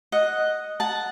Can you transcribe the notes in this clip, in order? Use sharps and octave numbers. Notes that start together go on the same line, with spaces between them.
D#5 F#5
F#5 A5